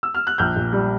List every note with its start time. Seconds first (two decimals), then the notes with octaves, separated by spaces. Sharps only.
0.03 E6
0.14 F6
0.27 F#6
0.38 A#1 F6 G6
0.56 A#2
0.73 G3